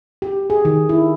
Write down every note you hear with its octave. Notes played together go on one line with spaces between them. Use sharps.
G4
G#4
D#3
E4